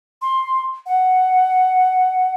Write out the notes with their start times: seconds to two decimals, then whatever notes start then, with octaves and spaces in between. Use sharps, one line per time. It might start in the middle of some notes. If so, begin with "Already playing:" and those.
0.22 C6
0.86 F#5